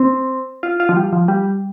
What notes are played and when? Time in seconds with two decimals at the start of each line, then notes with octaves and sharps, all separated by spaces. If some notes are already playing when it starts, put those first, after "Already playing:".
Already playing: C4
0.63 F4
0.80 F4
0.89 F3
0.97 G3
1.13 F3
1.28 G3